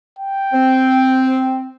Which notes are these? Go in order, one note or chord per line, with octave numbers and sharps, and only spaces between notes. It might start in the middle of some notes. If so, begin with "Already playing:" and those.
G5
C4